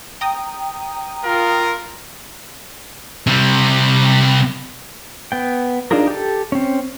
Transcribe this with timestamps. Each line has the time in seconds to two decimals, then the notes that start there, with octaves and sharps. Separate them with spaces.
0.21 G5 A#5 D#6
1.25 F4 A#4
3.27 C3 G3
5.32 B3 G5
5.91 D4 D#4 F4 G#4 A#4
6.07 G4 A4
6.52 C4 C#4